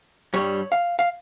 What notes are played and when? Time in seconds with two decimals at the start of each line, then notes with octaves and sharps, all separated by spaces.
0.34 G2 G3 C#5
0.72 F5
0.99 F5